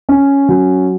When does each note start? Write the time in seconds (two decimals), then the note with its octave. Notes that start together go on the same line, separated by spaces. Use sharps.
0.09 C#4
0.48 F#3